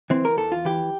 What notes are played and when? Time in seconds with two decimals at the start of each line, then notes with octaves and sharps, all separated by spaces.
0.10 E3 C4
0.25 A#4
0.37 E2 A4
0.52 F4
0.65 E3 G4